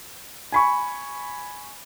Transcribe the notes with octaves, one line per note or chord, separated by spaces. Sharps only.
G#5 B5 C#6